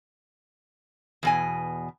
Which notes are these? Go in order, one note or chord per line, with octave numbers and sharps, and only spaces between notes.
E2 B2 G#5